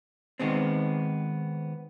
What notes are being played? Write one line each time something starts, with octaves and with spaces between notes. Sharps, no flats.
D#3 G#3 B3 C4